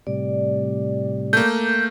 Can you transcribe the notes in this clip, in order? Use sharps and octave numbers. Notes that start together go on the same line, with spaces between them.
A2 C3 G3 D5
A3 A#3 G6